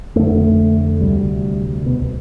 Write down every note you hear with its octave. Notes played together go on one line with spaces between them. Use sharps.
F2 D3 A3
D2 C3 G3
C2 B2 B3